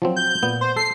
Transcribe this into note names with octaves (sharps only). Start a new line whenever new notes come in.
F3 F#3 C4
G6
A#2 B3
C5
A4 C7